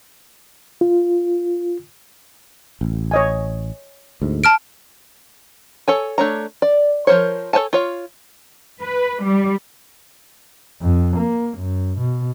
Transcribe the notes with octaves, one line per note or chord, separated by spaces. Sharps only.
F4
A1
C#5 D#5 G#5
D2 G#2
A5 F6 D7
A4 C#5 G#5
A3 D4 C#5 A#5
D5
F3 A3 A#4 C5 C#5
A4 C5 C#5 G#5 A5
F4 C#5 F5
B4
G3
F2
A#3
F#2
B2